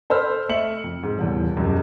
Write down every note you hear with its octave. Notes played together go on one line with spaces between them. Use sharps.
A4 C5 B5 E6 F6
A3 D#5 E5 C#7 F#7
F2
G#2
D#1 E2
E1 F#2 G4